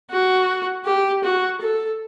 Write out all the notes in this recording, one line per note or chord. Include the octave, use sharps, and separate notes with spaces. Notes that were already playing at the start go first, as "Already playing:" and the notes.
F#4
G4
F#4
A4